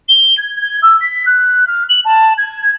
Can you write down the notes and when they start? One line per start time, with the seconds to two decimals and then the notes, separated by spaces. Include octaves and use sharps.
0.09 G7
0.38 G#6
0.62 G#6
0.82 E6
1.01 B6
1.26 F#6
1.67 F6
1.89 F#7
2.05 A5
2.38 G#6